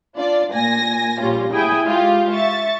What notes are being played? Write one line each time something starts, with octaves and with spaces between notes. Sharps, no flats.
D4 F4 D5
A#2 G#5 A#6
A#1 A#2 G3 C#4 F4
E4 G#4 G5 G#5 D#6
G#3 F4 G4
E5 C#6 A6